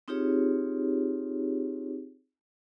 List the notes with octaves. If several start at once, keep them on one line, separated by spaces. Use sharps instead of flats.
C4 D#4 F4 G4 G#4 C#5